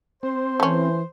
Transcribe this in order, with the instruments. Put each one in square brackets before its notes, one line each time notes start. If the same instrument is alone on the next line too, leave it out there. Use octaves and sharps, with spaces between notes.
[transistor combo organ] C4 [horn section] C5
[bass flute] E3 [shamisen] A3 C#4